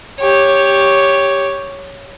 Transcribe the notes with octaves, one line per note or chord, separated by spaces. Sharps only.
G4 C#5